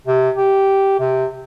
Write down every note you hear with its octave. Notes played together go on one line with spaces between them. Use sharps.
C3
G4
C3